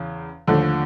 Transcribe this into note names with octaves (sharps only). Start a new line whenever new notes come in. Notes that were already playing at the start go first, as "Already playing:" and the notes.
Already playing: E2 C#3
D#2 D3 F3 A3